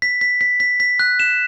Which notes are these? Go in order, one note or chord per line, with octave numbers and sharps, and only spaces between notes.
B6
B6
B6
B6
B6
F#6
E7